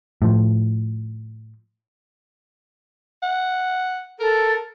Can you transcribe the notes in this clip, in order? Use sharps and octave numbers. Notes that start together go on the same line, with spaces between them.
A2 F3
F#5
A4 A#4